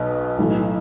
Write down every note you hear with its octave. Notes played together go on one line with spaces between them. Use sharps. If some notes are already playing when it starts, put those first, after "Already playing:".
Already playing: B1 B2
B1 A2 E3